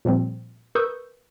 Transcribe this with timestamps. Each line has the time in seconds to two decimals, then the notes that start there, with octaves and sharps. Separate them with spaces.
0.05 A#2 F3 G3 C4
0.75 A#4 B4 C#6 D#6 E6 G6